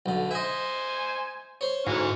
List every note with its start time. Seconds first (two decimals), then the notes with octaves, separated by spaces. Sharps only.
0.06 B1 D3
0.31 C5 D#5 E5 G#5
1.61 C5 C#5
1.87 D2 G#2 E3 C#4